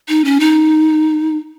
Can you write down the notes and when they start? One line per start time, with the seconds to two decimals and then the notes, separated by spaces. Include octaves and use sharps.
0.08 D#4
0.25 C#4
0.40 D#4